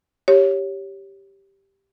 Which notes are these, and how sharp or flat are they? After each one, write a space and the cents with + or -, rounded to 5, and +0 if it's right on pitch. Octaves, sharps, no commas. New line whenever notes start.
G4 +0 C#5 +0